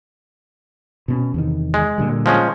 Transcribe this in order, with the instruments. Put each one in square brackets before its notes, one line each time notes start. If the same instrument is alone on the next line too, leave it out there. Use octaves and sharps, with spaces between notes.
[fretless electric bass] B2 C4 C#4
E2 C3 D#3
[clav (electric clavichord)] G#3
[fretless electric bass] A#2 D3 G3
[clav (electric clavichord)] F3 G#3 C#4